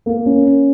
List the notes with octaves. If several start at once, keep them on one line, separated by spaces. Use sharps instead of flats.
A#3
C#4